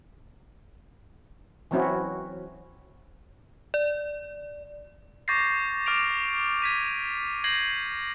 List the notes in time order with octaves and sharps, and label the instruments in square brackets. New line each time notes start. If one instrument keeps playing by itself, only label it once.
[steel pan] E3 F#3 C4 C#4 E4 F#4
[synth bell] D5
[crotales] C#6 D6 G6 A6 A#6 C7
D6 F6 A6 D7 F7
G#6 B6 D#7
G6 G#6 A#6 C7 F#7